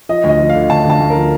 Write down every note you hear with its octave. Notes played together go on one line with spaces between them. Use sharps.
F3 D#5
D2
D#5
F3
F5
D3
D2 A5
D2 A5
D2
A#4
F3